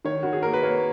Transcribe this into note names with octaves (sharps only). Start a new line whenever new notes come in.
D#3 C#5
D#3 F#4
G#4
A#3 A#4
B4
A#3 C#5